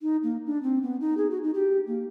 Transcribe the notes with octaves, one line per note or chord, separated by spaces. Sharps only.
D#4
A#3
D4
C4
B3
D#4
G#4
F#4
D#4
G4
A#3